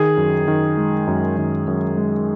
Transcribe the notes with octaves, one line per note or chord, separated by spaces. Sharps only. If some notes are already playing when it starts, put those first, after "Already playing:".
Already playing: D#3 G#4
F#2
D#3
G#3
F#2
D#3
F#2
G#3